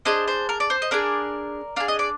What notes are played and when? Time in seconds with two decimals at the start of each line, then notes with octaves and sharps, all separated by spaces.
0.05 D4 G#4 C5 D#5
0.28 C5
0.49 A#4
0.60 D5
0.70 C5
0.82 D#5
0.91 D4 G#4 A#4 D5
1.76 D4 G#4 F5
1.88 D#5
1.99 D5